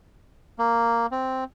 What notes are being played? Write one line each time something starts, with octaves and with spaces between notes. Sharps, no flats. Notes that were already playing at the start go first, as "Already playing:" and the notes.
A#3
C4